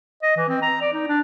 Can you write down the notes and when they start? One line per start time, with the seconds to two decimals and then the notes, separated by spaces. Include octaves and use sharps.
0.23 D#5
0.37 E3
0.49 C4
0.62 A#5
0.81 D5
0.93 D#4
1.08 D4